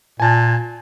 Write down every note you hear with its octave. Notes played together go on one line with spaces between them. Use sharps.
A#2 G#5 A5